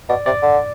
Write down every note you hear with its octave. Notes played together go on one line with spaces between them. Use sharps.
B2 D5
C3 D5
D3